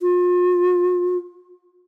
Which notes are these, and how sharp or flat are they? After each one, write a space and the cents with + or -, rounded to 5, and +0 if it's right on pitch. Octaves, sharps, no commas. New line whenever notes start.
F4 +40